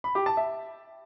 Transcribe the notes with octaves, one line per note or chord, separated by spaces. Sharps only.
B5
G4
A5
E5